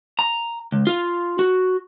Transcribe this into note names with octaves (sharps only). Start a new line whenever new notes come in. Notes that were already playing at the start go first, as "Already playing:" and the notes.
A#5
C#2
F4
F#4